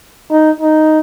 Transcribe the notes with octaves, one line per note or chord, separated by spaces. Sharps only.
D#4
D#4